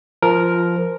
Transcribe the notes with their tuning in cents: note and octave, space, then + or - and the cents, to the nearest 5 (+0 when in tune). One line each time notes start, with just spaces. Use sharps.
F3 -10 A#4 +0